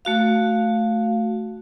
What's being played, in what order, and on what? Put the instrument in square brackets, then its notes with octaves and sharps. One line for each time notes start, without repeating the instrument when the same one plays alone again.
[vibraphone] A3 F#4 F5